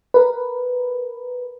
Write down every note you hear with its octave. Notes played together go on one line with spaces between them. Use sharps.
A#4 B4